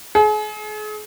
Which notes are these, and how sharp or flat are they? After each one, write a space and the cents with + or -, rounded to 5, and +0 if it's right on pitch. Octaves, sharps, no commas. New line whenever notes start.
G#4 +40